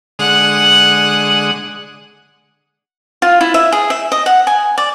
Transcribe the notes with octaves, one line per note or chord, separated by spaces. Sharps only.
D3 G#3 F#5 D#6
F4
E4
E5
G#4
E5
D#5
F#5
G#5
D5